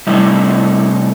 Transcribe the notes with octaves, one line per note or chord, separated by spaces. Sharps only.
C3 G3 A3 D#4 E4